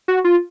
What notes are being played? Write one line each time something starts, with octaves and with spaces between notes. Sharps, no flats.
F#4
F4